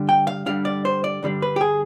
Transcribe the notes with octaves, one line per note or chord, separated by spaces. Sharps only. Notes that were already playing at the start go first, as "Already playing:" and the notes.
Already playing: G2 D3 G3 D4
G5
F5
G2 D3 G3 D4 F5
D5
C5
D5
G2 D3 G3 D4
B4
G4
G#4